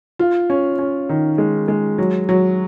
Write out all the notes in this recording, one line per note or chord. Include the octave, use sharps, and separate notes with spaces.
F4
C#4
C#4
D#3
G#3
G#3
F#3
F#3